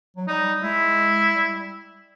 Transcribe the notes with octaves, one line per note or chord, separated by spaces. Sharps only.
F#3
G3 D#4
G#3 E4
G3